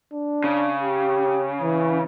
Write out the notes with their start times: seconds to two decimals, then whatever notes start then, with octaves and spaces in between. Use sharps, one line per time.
0.13 D4
0.44 C#3
0.82 G4
1.62 E3